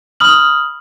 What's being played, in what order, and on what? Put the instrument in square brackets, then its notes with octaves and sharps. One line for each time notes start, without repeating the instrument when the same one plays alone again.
[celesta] B5 D#6 F6 F#7